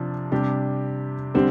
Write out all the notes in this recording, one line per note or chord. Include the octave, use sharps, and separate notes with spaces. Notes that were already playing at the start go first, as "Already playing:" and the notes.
Already playing: C3 F3 D4
C3 G3 D4 G4
D3 G3 C4